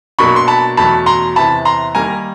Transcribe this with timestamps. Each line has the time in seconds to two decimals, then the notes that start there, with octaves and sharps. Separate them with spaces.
0.19 B2 F#3 A#3 D4 B5 C#6
0.36 C6
0.48 A5 B5
0.77 E2 B2 F#3 A3 A5 B5
1.06 A#5 C6
1.36 E2 C3 E3 A5 B5
1.65 A#5 C6
1.95 D#3 G3 A#3 G#5 A#5